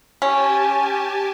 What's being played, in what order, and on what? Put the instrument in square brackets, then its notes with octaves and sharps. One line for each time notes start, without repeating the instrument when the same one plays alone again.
[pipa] C#4 [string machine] G4 G#5 A5